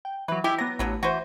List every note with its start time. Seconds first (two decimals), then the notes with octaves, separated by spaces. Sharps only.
0.05 G5
0.28 E3 F#3 B4
0.44 G#3 E4 G4
0.58 F#3 B3 A#6
0.79 A1 D3 F#3 B3
1.03 E3 F#4 B4 C5